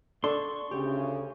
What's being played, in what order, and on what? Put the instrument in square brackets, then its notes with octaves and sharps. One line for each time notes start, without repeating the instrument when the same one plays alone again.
[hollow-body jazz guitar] D4 A4 D5 [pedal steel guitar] C6 C#6
[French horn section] D2 C#3 [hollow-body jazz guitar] G4